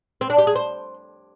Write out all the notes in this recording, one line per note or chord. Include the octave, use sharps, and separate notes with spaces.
C4
D4
G4
G#4
C5